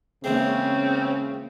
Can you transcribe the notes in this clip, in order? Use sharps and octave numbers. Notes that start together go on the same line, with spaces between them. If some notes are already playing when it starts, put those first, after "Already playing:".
A#1 E2 C#3 G#3 C4 C#4